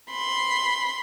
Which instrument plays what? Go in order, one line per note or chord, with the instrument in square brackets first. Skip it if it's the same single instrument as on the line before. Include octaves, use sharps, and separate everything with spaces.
[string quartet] B5 C6